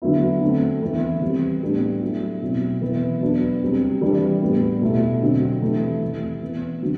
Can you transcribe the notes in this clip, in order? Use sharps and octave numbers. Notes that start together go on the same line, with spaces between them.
D3 F#3 B3 E4
D3 A3 C4
E3 B3 E4
C3 E3 G3 C4
A2 G3 B3 D4
F#3 A3 E4
B2 F#3 C4 E4
E3 B3 E4
F#3 B3 D4
C3 G3 C4
E3 G3 D4
A2 G3 B3
B2 A3 E4
D3 F#3 C4
C3 E3 A3 E4
E3 A3 E4
E3 B3 E4
D3 F#3 C4